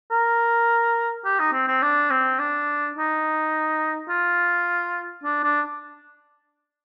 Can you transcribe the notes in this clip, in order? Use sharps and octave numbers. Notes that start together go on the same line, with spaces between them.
A#4
G4
D#4
C4
C4
D4
C4
D4
D#4
F4
D4
D4